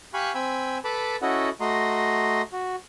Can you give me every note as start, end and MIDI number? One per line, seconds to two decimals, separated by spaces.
0.14 0.33 67
0.14 0.33 77
0.14 0.33 80
0.14 0.33 83
0.14 0.33 85
0.14 0.33 90
0.34 0.78 60
0.34 0.78 79
0.34 0.78 80
0.34 0.78 83
0.34 0.78 88
0.84 1.16 69
0.84 1.16 71
0.84 1.16 81
0.84 1.16 83
0.84 1.16 86
1.22 1.50 61
1.22 1.50 64
1.22 1.50 66
1.22 1.50 69
1.22 1.50 75
1.22 1.50 78
1.61 2.42 57
1.61 2.42 66
1.61 2.42 75
1.61 2.42 82
1.61 2.42 84
2.53 2.76 66